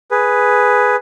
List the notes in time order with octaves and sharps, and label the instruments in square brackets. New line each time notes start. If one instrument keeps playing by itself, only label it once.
[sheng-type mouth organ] G#4 B4